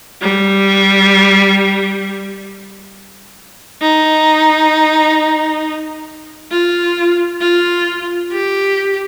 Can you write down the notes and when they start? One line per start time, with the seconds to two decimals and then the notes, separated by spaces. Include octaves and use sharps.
0.22 G3
3.82 D#4
6.51 F4
7.41 F4
8.32 G4